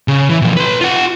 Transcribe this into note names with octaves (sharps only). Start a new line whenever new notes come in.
C#3
E3
B2 F3
B4 C6
F4 F#5